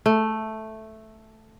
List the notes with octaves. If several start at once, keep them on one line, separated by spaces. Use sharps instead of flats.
A3